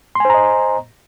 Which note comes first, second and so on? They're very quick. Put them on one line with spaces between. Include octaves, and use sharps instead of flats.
C6 G#5 C5 A#5 D#5